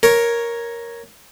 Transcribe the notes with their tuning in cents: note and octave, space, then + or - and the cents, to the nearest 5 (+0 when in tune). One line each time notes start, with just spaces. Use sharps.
A#4 +5 C#5 +0